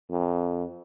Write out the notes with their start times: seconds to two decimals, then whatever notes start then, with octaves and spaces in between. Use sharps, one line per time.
0.10 F2